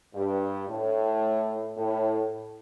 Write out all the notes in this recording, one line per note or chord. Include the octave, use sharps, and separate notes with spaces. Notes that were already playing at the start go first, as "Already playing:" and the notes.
G2
A2
A2